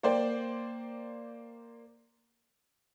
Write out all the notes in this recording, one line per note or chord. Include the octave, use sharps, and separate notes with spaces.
A#3 C5 D5 G5